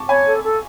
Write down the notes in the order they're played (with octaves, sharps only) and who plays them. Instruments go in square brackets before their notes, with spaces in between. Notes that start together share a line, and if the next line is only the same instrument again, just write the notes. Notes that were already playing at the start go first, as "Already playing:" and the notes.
Already playing: [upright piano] A5 C#6 D6
[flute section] C#5 [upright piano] G#5 B5
[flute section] A4
A4